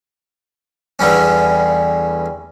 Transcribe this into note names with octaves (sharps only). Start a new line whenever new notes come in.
E2 D3 G3 C#4